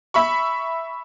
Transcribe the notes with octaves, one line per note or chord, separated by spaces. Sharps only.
E5 B5 C#6